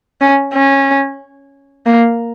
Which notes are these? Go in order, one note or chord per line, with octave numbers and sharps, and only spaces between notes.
C#4
C#4
A#3